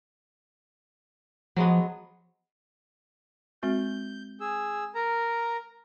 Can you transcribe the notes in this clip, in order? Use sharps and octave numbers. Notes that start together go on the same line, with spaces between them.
F3 F#3 G#3 B3
G#3 C4 F#4 G6
G#4 E6
A#4 A#5